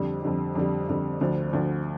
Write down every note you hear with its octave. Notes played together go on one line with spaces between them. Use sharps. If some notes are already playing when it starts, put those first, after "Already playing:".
Already playing: F2 D3 G3
F2 D3 G3
F2 D3 G3
F2 D3 G3
D2 D3 F3
D2 D3 F3